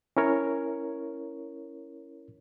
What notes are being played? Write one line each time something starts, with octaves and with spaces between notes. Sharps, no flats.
C#4 E4 A#4 C#5